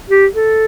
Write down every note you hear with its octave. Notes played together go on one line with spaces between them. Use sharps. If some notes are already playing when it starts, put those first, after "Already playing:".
G4
A4